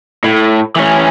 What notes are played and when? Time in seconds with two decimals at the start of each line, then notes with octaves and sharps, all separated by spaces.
0.24 A2
0.76 E3 C#4